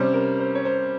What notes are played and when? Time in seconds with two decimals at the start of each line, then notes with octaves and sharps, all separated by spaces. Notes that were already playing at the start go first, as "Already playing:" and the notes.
Already playing: C3 G3 C#4 C5
0.13 A#4
0.39 C5
0.55 C#5
0.65 C5